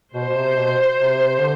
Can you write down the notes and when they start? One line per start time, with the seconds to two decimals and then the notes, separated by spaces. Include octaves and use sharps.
0.14 B2 C5
0.29 B2
0.36 C3
0.56 B2
0.97 C3
1.39 D3